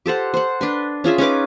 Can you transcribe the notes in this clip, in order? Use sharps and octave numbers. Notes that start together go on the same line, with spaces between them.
G4 A4 C5 F#5
C5 F#5
D4 B4 C6
C#4 F4 G#4 E5
C#4 D#4 B4 D6